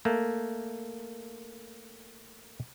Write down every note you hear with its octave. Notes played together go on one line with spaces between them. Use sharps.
A3 A#3